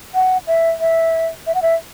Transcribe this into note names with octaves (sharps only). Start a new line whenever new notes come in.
F#5
E5
E5
E5
F#5
E5